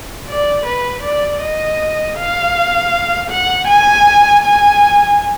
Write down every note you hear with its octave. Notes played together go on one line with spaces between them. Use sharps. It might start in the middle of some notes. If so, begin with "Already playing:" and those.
D5
B4
D5
D#5
F5
F#5
G#5
G#5